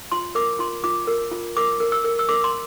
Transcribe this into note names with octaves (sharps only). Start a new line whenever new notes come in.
F4 C6
A#4 D6
F4 C6
F4 D6
A#4
F4
A#4 D6
A#4
E6
A#4
E6
A#4 D6
C6